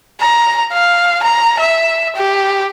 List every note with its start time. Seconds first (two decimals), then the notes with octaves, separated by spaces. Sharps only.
0.21 A#5
0.72 F5
1.23 A#5
1.59 E5
2.16 G4